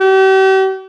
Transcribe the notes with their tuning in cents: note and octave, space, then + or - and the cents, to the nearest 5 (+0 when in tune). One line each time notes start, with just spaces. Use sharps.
G4 -40